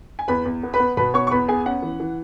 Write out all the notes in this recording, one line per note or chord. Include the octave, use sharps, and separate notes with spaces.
G#5
E2 B4 B5
E2
B3
B4 B5
B3
B2 B4 B5
B3 C#5 C#6
C#6
E2 B4 B5
B3 G#4 G#5
C#4 F#5
E3
E3